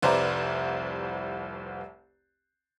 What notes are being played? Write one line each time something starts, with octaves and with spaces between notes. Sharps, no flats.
F1 C2 B4 C5 D5 A#5